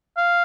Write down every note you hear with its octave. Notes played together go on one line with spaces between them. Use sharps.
F5